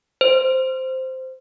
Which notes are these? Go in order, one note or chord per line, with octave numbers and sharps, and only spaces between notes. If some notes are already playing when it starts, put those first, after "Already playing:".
C5